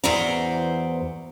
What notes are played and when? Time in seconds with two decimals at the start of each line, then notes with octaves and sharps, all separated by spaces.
0.04 E2 E3 F#4 C5 D5 A#5